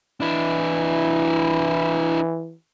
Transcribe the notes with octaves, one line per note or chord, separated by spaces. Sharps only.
E3 D4 E4